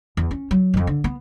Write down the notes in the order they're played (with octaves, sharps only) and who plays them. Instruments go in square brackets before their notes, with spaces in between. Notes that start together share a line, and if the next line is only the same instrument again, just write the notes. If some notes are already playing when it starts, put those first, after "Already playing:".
[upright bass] E2
C#4
F#3
E1 F2
D3
B3